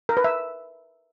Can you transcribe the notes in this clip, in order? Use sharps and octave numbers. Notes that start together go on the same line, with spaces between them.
A#4
B4
E5